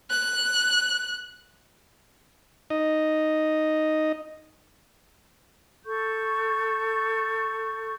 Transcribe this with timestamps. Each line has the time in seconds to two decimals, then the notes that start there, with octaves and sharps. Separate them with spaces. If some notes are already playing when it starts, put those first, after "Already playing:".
0.10 F#6
2.70 D#4 D#5
5.85 A4 C#6 G6